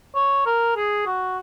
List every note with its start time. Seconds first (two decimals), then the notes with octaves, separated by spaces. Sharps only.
0.15 C#5
0.46 A#4
0.76 G#4
1.06 F#4